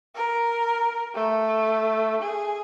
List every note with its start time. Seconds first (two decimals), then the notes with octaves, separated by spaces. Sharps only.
0.15 A#4
1.15 A3
2.23 G#4